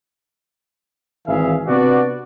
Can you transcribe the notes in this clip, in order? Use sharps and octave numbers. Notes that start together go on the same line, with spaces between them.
G#1 E3 G#4 E5 F5
C3 B3 D4 F#4 D5